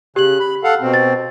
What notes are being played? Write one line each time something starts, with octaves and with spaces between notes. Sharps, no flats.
C#3 G4 F#6 F#7
B5
A4 F5 F#5
B2 C4
A6